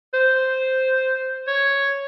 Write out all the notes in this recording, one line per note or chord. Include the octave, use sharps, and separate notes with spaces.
C5
C#5